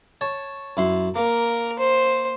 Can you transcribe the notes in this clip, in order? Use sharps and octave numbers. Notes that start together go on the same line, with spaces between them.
C#5 A5
F#2 E4 C6
A#3 A#4
C5